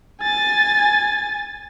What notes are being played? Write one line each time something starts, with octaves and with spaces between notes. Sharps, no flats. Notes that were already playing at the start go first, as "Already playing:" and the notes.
G#5 A6